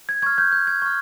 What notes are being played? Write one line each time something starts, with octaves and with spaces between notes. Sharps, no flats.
G#6
C#6 F6 G#6
G6
G6
G#6
C#6 F6